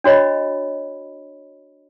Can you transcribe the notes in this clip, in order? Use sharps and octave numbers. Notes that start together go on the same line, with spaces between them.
D4 F#4 C#5 D#5 B5